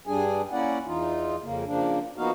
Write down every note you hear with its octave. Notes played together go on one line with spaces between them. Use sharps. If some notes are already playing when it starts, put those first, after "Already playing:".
G2 G3 D4 G#4 G#5
A#3 C#4 E4 D5 F#5
E2 E3 D#4 F4
F2 C#3 A#3
C#3 F3 A#3 D4
F3 A#3 B3 D#4 F#4 F5